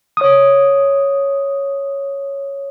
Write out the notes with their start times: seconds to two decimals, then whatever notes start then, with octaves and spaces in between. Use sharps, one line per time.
0.17 C#5 D#6